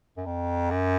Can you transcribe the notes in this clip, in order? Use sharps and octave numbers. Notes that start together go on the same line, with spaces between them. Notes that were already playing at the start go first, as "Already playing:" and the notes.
F#2
F2
F#2